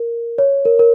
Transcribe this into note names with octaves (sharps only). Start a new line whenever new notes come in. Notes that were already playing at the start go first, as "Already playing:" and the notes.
Already playing: A#4
C#5
A#4
A#4